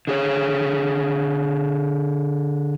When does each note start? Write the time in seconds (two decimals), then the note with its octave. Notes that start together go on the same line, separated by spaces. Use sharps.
0.07 D3 G#4 C#5